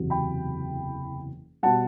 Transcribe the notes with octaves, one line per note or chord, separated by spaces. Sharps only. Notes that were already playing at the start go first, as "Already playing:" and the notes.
Already playing: F#1 E2 C3 F#3
G5 B5
B2 G3 F#5 A5